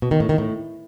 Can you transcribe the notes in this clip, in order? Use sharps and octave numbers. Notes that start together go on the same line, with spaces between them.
B2
D#3
A2
D#3
A2